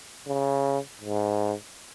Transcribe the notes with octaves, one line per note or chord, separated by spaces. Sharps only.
C#3
G#2